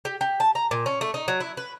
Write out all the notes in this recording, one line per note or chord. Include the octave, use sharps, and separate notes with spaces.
G4
G4
A5
A#5
A#2
C#4
A3
D#4
F#3
E4
B4